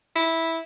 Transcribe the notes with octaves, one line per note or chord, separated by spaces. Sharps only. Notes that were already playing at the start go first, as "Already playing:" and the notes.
E4